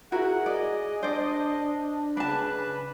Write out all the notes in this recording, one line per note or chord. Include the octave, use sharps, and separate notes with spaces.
E4 F#4 G#4 A#4 F#5
D5 D#5
D4 C5 D5
C#3 D4 B4 A5